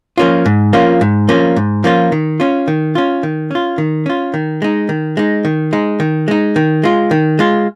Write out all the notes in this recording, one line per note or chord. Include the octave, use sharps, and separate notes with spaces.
F3 A#3 C#4 F4
G#2
F3 A#3 C#4 F4
G#2
F3 A#3 C#4 F4
G#2
F3 A#3 C#4 F4
D#3
C#4 F4
D#3
C#4 F4
D#3
C#4 F4
D#3
C#4 F4
D#3
G#3 D#4
D#3
G#3 D#4
D#3
G#3 D#4
D#3
G#3 D#4
D#3
G#3 F4
D#3
G#3 F4